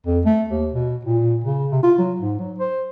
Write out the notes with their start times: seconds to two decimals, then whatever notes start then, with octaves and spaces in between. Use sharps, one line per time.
0.06 F2
0.26 A3
0.49 D#2
0.72 B2
1.05 A#2
1.44 C#3
1.72 C3
1.83 F4
1.98 F#3
2.20 G#2
2.39 F#3
2.58 C5